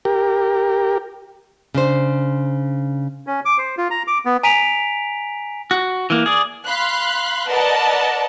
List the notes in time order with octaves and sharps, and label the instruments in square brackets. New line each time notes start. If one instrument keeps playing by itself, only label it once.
[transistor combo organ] G4 A#4
[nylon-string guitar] C#3 D4 C5
[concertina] C#4
D6
C5
F4
A#5
D6
B3
[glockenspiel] G#5 A#5 B6 D7 D#7 F7
[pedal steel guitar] F#4
E3 A#3
G#4 D5
[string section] F5 B5 C6 F#6
A#4 B4 D5 D#5 F#5 A5